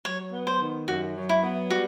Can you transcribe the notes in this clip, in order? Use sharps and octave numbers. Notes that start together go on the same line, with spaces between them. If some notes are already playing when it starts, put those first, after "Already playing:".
F#3 C#5
B3
C5
D#3
F#2 F#4
F#3
E4
B3
G3 F#4